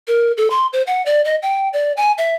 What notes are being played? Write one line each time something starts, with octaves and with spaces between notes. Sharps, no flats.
A#4
A4
C6
C5
F#5
D5
D#5
G5
D5
G#5
E5